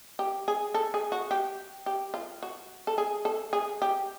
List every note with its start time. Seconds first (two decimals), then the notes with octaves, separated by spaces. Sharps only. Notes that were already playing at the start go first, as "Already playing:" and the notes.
0.19 G4
0.48 G#4
0.74 A4
0.94 G#4
1.12 F#4
1.31 G4
1.86 G4
2.14 F4
2.43 F#4
2.87 A4
2.98 G#4
3.25 A4
3.53 G#4
3.82 G4